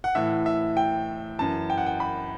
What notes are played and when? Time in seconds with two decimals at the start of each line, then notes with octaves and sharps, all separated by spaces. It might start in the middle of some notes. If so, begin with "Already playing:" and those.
0.04 F#5
0.15 A2 E3 E5
0.46 E5
0.77 G5
1.39 F#2 E3 A5
1.70 G5
1.78 F#5
1.86 G5
2.00 B5